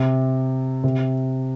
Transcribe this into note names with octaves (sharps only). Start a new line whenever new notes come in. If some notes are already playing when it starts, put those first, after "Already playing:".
Already playing: C3
C3